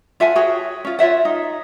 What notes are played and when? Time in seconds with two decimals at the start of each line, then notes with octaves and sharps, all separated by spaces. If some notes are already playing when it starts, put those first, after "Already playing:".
0.20 F4 E5 F#5 G#5
0.36 F#4 G#4 C#5 G5
0.85 C#4 F4
0.99 F4 C#5 E5 F#5
1.25 D#4